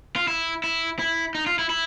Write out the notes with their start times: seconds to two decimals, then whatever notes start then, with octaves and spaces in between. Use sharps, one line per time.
0.16 F4
0.28 E4
0.64 E4
0.99 E4
1.35 D#4
1.46 F4
1.59 E4
1.70 E4